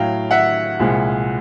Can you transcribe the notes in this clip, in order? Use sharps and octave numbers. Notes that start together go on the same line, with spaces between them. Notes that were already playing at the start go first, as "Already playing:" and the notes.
Already playing: A2 F#3 F5 G5
E5 F#5
C2 A#2 F3 G#3